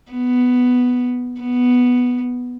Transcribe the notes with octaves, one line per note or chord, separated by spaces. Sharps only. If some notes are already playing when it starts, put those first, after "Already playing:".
B3
B3